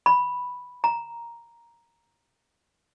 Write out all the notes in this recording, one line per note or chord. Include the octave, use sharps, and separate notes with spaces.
B5
A#5